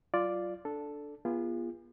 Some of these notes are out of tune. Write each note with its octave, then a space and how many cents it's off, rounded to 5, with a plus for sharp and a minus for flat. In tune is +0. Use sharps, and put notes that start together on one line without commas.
F#3 +30 F4 +0 D5 +0
D4 -5 A4 +0
B3 -35 F4 -25 G#4 -30